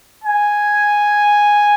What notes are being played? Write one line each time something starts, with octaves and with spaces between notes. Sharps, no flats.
G#5